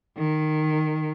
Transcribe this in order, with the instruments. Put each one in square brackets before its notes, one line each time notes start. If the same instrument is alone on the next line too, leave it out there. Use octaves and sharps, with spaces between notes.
[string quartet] D#3